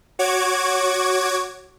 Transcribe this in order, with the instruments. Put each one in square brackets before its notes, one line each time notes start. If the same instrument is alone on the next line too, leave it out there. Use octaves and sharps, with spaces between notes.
[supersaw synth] F#4 C#5 D6 G#6